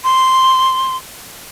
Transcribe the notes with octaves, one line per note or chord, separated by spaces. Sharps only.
C6